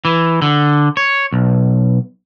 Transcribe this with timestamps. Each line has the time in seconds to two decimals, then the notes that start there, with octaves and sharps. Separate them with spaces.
0.05 E3
0.42 D3
0.97 C#5
1.33 B1